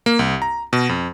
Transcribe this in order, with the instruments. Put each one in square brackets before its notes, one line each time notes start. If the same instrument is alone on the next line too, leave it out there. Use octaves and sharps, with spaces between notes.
[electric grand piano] A#3
C2
A#5
B2
F2